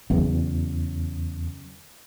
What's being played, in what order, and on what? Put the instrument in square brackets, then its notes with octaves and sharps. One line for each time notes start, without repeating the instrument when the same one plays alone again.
[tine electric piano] E2 [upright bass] C#3 F#3